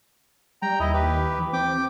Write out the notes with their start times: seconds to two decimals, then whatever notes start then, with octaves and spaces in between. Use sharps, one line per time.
0.62 G3 G5 A#5
0.80 D#2 E4 D#5
0.94 D#2 G4 B4
1.39 E3
1.53 C4 G5 D6